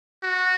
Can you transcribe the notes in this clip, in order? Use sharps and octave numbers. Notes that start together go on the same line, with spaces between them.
F#4